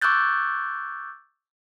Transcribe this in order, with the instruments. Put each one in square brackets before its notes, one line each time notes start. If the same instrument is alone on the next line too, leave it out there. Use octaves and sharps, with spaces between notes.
[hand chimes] C#6 D6 E6 F#6 G6 A6